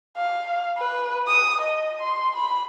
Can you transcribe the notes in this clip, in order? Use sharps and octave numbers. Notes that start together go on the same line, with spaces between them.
F5
B4
D#6
D#5
C6
B5